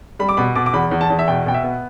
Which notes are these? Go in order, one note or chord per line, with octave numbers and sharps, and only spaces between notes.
G3 B5
D6
B2 B5
B2 D6
D6
E2 B5
E2
A5
E2
E5
B2 G5
B2 G5
E5
B3